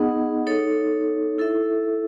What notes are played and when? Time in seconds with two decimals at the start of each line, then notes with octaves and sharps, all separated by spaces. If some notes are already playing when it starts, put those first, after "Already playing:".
Already playing: B3 D#4 G#4 D#5 F#5
0.46 D#4 A4 C#5
1.38 E4 A4 E5